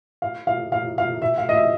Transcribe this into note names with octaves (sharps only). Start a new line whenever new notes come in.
F5
F5
F5
F5
E5
F5
D#5
E5